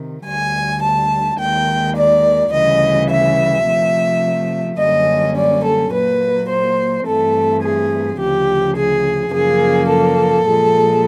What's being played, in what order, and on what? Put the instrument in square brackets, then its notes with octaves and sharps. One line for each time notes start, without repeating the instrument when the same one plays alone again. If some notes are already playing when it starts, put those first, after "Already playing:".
Already playing: [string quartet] C3 D#3
D2 D3 G3 G#5
A5
D#2 D#3 G#3 G5
D5
D2 C#3 E3 G3 D#5
E5
C3 F3 A3
F#2 D3 G3 A#3 C#4 D#5
D5
A4
A#2 F#3 A#3 B4
C5
G2 E3 A3 C4 A4
G#4
D2 C#3 F3 G4
G#4
F#2 C#3 F3 A#3 G#4
A4
A#2 F3 G#3